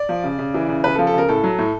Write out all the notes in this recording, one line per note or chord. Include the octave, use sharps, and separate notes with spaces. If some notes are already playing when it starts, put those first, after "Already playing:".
Already playing: D5
F3
C#3
C#3
E3
C#3
C#3 B4
A4
F3
A4
C#3 A#4
A2 A4
F#3
A2